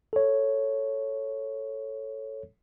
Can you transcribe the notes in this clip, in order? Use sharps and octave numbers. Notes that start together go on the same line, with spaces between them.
A4 C#5